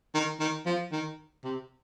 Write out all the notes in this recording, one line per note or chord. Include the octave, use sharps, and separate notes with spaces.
D#3
D#3
F3
D#3
C3